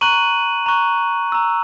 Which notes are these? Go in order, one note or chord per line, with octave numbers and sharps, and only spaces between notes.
A#5 C#6 F#6 D#7 F#7
A#5 C#6 F#6
A#5 E6